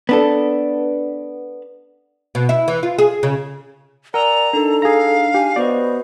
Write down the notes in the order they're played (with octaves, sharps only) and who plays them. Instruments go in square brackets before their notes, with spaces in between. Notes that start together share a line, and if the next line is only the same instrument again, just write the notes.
[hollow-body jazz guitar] B3 D4 A4
[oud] B2
E4
E3
F4
G#4
C#3
[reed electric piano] A#4 [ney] D5 [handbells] F#5 G#5 E6 [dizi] A#5
[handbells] D4 D#4 [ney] A4
[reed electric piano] G#4 A#5 [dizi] F5
[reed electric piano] G4 [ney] G#5
[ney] B3 [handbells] F#4 C5 D#5 [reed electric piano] D5